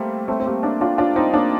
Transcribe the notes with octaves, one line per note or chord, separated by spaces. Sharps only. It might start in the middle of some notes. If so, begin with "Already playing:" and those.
Already playing: G3 A3 A#3 C4
A3 C4
C4
G3 A#3
A#3 D4
D4 F4
D4 F4
C4 D#4
A#3 D4